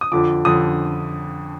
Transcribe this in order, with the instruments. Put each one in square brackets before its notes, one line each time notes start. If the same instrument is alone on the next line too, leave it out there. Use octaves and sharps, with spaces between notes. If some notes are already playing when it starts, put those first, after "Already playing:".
[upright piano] D#6
F2 D3 F3 D6
F2 D3 F3 D#6